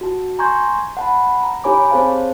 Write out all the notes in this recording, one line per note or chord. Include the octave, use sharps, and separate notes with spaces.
F#4 A5
G#5 A#5 C6 C#6 G6 G#6
F#5 A5 B5
A#5
D#4 G4 C#5 G#5 B5 D6
C4 G#4 C5 C#5 F5 A5